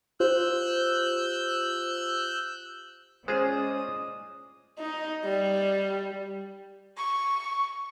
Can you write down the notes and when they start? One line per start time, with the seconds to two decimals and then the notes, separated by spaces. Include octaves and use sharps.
0.20 F4 G4 C5 E6 F#6 G6
3.28 G#3 C#4 F4 G#4 C5 D5 D#5 D#6
4.79 D#4
5.25 G3
6.97 C#6